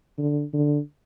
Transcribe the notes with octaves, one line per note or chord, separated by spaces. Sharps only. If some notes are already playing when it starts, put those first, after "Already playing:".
D3
D3